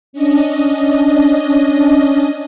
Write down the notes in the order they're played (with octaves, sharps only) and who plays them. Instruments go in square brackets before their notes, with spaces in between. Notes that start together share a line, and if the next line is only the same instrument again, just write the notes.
[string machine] C#4 D4 D#5